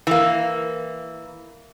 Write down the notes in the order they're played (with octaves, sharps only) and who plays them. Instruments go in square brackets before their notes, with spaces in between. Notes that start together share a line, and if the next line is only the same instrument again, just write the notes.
[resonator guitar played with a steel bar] E3 A#3